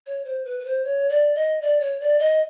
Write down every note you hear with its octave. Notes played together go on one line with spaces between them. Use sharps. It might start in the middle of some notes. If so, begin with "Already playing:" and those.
C#5
C5
B4
B4
C5
C#5
D5
D#5
D5
C#5
D5
D#5